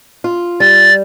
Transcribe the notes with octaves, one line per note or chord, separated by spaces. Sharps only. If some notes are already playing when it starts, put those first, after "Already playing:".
F4
G3 A6